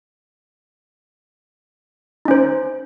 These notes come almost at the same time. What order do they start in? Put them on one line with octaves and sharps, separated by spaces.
D#4 C#4 C5